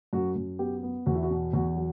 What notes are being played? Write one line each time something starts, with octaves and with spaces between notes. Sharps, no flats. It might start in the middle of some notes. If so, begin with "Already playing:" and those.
F#2 F#4
F#2
B3 G4
B3
E2 F#4
E4
F#4
B2
E2 F#4
F#3